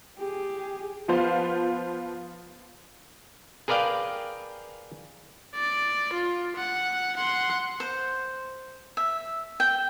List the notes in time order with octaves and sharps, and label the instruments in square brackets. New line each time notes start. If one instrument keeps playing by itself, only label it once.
[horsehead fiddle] G4 G#4
[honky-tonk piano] F3 B3 F4 C5 F5
[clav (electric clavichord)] G#4 A#4 B4 D5 F5 G5
[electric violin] D5
F4
F#5
F#5 C6
[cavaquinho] C5
E5
G5